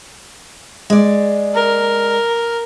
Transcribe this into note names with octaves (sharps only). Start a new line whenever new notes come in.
G#3 D5
A#4